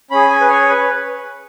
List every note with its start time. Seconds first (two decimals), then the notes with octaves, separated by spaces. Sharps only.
0.11 C#4 G#4 B5
0.30 G#5
0.41 B4
0.49 C#5
0.69 B4